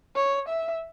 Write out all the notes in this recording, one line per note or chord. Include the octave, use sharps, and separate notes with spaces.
C#5
E5